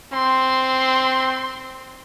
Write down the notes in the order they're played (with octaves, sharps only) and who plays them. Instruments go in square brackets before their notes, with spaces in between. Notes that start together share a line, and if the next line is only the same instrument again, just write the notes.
[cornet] C4 [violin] C6